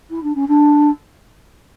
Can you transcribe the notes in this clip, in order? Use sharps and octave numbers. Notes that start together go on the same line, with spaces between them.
E4
D4
C#4
D4